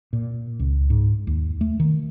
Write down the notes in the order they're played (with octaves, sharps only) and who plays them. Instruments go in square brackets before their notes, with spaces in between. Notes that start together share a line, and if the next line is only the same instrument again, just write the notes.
[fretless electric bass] A#2
C#2
G#2
D#2
A3
D#3